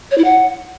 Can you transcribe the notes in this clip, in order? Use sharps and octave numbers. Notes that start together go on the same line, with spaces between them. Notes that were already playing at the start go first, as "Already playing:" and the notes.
C#5
E4
F#5